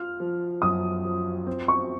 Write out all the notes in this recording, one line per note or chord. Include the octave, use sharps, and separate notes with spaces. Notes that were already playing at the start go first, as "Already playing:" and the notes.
Already playing: F4 F6
F3
F#2 D#6
F3
C4
C#6